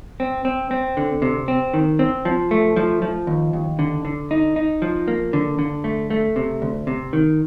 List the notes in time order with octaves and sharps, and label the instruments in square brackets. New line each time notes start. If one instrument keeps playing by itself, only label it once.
[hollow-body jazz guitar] C4
C4
C4
D3
C3
C4
D#3
C4
F3
A3
F3
F3
D#2
D#2
D3
D3
D#4
D#4
F3
A#3
D3
D3
A3
A3
C3
D2
C3
D#3